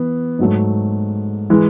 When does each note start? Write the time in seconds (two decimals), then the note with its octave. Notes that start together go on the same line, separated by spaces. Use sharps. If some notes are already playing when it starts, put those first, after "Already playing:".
Already playing: E3 B3
0.39 G#2 F#3 A3
1.50 E3 G#3